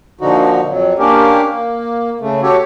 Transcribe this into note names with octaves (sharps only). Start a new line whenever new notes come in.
A#2 D3 F3 D#4 F#4
F2 F#3
A#3 C#4 D4 G4 A#4
A#3
C#3 A3
F#4 G4 A4 C#5